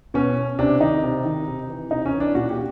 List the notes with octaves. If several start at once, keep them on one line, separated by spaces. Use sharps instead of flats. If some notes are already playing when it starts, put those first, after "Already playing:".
B2 C#4
C3 D4
D#3 D#4
C3
D#3
C3
E3
C3 D#4
C#4
E3
D4
A#2 F#4
G4